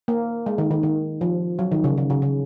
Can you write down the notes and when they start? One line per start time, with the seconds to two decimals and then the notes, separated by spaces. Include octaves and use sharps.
0.08 A#3
0.46 G#3
0.58 D#3
0.71 D#3
0.83 D#3
1.21 F3
1.59 F#3
1.72 D#3
1.84 C#3
1.98 C#3
2.10 C#3
2.22 C#3